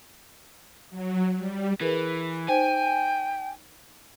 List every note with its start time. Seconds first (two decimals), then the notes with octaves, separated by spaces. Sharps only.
0.90 F#3
1.36 G3
1.81 E3 G#4 A#4 B4
2.48 D#4 C5 G5 G#5